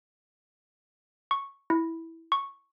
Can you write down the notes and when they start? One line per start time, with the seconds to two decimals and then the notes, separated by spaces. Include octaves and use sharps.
1.31 C#6
1.70 E4
2.32 C#6